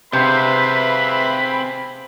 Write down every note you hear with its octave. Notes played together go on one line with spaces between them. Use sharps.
C3 C4 G#4 B4 C5 E5 F5 B5